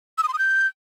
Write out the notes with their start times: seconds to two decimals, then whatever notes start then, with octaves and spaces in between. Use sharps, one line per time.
0.18 E6
0.23 D#6
0.28 C6
0.33 D#6
0.39 G6